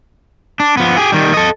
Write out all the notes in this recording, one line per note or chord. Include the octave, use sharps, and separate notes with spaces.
D4
F3 B3
G4 G#4
D#3 G3
A4 D#5